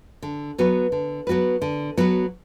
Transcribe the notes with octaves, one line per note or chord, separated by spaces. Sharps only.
D3
F#3 B3 F#4 B4
D3
F#3 B3 F#4 B4
D3
F#3 B3 F#4 B4